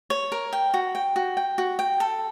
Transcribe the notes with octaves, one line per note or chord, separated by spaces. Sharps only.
C#5
A#4
G5
F#4
G5
F#4
G5
F#4
G5
A4